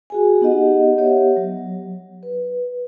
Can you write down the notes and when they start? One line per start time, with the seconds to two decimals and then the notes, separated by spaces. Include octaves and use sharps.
0.10 F#4 G#4 G#5
0.41 B3 D#4 G4 D#5 F#5
0.98 B3 G4 C#5 E5 F#5
1.36 F#3
2.23 B4